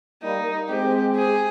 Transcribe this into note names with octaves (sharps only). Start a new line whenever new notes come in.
G3 A#3 D#4
G#3 C4 G4
G#4